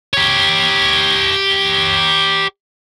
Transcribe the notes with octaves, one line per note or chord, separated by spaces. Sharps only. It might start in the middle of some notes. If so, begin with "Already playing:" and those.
G4 C#5